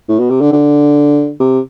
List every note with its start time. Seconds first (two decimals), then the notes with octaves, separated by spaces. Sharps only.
0.09 A2
0.19 B2
0.30 C3
0.41 D3
0.53 D3
1.40 C3